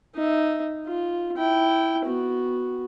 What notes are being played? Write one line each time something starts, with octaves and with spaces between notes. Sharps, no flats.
D#4 E5
F4
E4 G5
B3 F#4